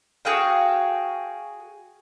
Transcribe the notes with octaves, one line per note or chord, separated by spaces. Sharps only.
F#4 G#4 F5 G5